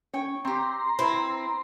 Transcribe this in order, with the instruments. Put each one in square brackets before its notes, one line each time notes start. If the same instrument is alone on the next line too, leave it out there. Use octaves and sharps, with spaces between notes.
[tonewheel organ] C#4 [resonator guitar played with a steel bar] C#5 G5
[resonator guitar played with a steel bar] C4 G4 [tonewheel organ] A#5 C6
[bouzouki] C4 [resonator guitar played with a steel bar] E4